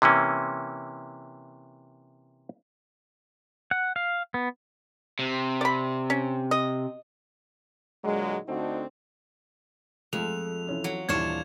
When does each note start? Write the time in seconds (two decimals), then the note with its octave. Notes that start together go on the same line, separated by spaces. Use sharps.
0.02 C3 E3 A#3 C#4
3.71 F#5
3.96 F5
4.34 B3
5.19 C3
5.61 D5 B5
6.10 C#4
6.51 D#5
8.03 A#2 D3 F#3 G#3
8.47 D2 D3 A3 C4 D#4 F#4
10.13 F2 F3 G#3 A3 F7
10.67 E3 C#4 F4
10.84 F#3
11.09 D#1 E3 D4 F4 C#5 G#6 E7